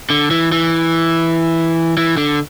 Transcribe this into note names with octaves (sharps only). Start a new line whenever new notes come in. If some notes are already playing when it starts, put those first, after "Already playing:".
D3
E3
E3
E3
D3